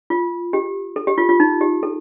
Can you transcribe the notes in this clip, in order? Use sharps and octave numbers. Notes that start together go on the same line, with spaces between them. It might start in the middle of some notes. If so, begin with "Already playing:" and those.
F4
G4
A4
G4
F4
F4
D#4
G4
A4